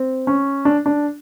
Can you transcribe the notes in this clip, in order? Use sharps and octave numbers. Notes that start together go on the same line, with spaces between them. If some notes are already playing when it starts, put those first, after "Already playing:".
Already playing: C4
C#4
D4
D4